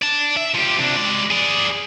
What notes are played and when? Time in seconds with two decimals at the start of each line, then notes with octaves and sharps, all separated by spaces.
0.02 D5 A5
0.37 E5
0.55 F3 G4
0.80 C3 D4
0.97 G#3 D5
1.31 G#4 D5